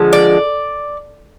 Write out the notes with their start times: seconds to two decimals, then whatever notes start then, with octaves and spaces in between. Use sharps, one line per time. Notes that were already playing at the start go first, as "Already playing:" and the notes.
Already playing: D3 F3 G#3
0.13 D5